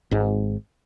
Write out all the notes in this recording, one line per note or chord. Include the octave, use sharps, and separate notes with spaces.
G#1 G#2